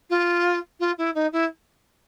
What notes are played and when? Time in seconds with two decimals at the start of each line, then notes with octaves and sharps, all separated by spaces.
0.10 F4
0.79 F4
0.98 E4
1.14 D#4
1.32 E4